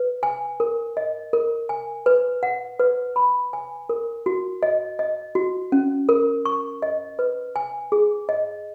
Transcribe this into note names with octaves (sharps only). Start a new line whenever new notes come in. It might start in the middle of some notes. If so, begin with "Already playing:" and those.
Already playing: B4
G#5
A#4
D#5
A#4
G#5
B4
F#5
B4
B5
G#5
A#4
F#4
D#5
D#5
F#4
C#4
A#4
C#6
D#5
B4
G#5
G#4
D#5